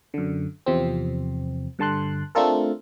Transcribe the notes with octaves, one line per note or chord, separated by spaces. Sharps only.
F#2 D3
E2 C3 F3 C4
G2 D3 A5 C6 F#6
A3 C4 D4 F4 A4 A#4